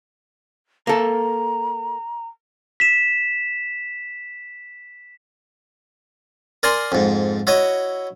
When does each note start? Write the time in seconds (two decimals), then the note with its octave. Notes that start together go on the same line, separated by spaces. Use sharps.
0.87 A#3 A4 A#5
2.80 B6 E7
6.63 A#4 D5 G#5 A#5 C6
6.92 F2 G#2
7.47 E4 F#4 C#5 D#5